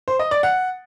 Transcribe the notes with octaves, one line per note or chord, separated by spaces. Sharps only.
C5
D#5
D5
F#5